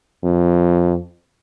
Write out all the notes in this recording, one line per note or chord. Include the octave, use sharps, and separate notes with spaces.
F2